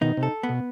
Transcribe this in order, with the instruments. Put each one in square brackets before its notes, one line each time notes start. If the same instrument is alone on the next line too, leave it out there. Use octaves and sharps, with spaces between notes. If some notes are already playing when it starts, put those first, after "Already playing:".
[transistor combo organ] B2 D#3 [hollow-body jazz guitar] D#4
[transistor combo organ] C3
[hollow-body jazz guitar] A4
B3
[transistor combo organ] B2